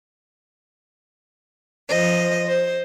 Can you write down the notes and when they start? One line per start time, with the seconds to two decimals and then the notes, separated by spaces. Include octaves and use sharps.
1.89 F3 C5 D#5
2.47 C5